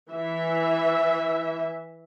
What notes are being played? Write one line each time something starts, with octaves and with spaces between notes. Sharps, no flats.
E3 E5